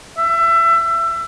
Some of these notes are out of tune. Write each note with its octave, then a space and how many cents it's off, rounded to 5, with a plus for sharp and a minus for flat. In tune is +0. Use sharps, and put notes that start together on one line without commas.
E5 +25